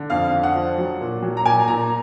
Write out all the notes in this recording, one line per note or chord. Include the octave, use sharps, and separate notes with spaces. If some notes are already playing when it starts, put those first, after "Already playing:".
Already playing: D3
F2 F5
D3
F#5
F3
F#3
A#2
F#3
A#5
A#2 G#5
A#2 A#5